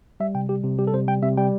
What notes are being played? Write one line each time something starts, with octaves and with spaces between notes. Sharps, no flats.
G3 E5
C3 G5
G3 G4
C3
G3 G4
A4
C3 C5
G3 G5
C3 E5
G3 G5